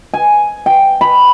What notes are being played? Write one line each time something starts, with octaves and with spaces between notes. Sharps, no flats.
G#5
G5
B5